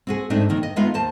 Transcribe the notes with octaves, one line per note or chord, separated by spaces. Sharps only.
C4 F#4 G#4
G#2 A3 C4 D4 D#4
F2 D#3 A#3
D#5
G#3 A3 B3 D#4 F4 F5
D#2 C5 A5